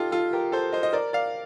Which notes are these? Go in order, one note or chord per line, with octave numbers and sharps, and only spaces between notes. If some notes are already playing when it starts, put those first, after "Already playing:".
Already playing: D#4 F4 G4 A4
F4 A4
G4 A#4
A4 C5
C5 D#5
D#5
A#4 D5
D5 F5